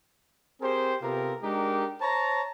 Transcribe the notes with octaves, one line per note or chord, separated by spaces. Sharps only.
C4 G4 G#4 A#4 C5
C3 B3 F4 G4 A4 A#4
G#3 D4 D#4 G4 A#4
C5 C#5 A5 A#5